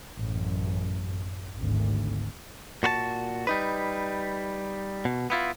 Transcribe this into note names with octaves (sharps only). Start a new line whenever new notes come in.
A1 F#2
G#1 D2
A#2 F#4 B4 A5
G3 D#4 B4
B2
B3 E4 F4